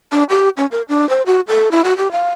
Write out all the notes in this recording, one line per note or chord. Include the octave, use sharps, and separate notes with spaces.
D4
G4
C#4
A#4
D4
C5
F#4
A4
E4
F#4
G4
F5